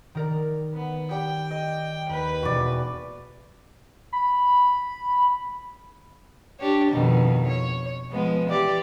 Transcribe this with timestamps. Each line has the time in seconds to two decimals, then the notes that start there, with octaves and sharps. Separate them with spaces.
0.15 D#3 A#4 D5
0.73 B3
1.11 G3 G5
1.51 D#5
2.09 D#2 B4
2.43 E1 E2 F#4 D5
4.13 B5
6.59 D4 G4 C#5
6.91 F2 B2 D#3
7.48 C#5
8.11 F3 G#3 B3
8.49 E3 G4 D5